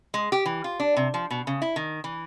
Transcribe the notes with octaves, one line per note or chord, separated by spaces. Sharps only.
G#3
G4
E3
F4
D4
C3
F3
B2
C#3
E4
D#3
E3